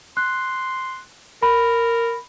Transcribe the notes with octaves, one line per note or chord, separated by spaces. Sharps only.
C6 F#6
A#4 B5